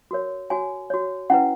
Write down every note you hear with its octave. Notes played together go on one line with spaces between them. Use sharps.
F#4 A#4 C#5
F#4 C#5 G#5
F#4 C#5
C#4 E4 B4 F#5